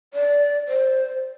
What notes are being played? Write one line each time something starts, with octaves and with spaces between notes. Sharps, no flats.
D5
C5